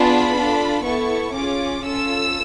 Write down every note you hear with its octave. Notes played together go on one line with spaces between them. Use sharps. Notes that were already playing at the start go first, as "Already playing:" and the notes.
Already playing: B3 D4 F4 G#4 B5
D4 F4 A4
B3 E4 A4 C#6
C#4 F4 G#4 D6
C#4 F4 A4 E6